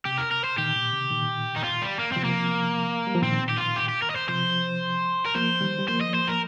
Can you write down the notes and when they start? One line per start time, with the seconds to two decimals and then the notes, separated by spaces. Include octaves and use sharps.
0.05 C3 G4
0.18 A#4
0.31 A#4
0.44 C5
0.58 A#2 D#3 G4
0.76 A#2
0.93 C3
1.10 A#2 D#3
1.56 D#4
1.64 F4
1.82 G3
1.99 A#3
2.12 C3 F3 C4
2.24 A#3
3.07 G3
3.15 F3
3.23 A#2 D#3 C4
3.49 G4
3.58 F4
3.76 G4
3.89 G4
4.02 A#4
4.10 D#5
4.16 C5
4.29 C3 F3 C5
5.26 A#4
5.34 F3 A#3 C5
5.61 D#3 G3
5.78 G3
5.88 F3 A#3 C5
6.01 D#5
6.14 C5
6.28 A#4